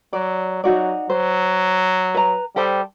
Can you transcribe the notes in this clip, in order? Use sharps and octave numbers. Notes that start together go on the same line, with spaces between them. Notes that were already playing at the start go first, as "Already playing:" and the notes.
F#3 D5
F#3 D#4 F#4 D5
F#3 C5
B4 A#5
G3 G4 A4 C5